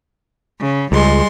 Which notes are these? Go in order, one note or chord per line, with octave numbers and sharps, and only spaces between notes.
C#3
C#2 G3 G#3 C6